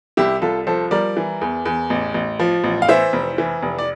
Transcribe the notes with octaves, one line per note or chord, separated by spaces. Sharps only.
C2 E4 G4
C2 F4 A4
F3 A4 C5
G3 A#4 D5
E3
E2
E2
A1
A1
F3
A1
F5
E3 C5 E5
F1
E3
F1
D5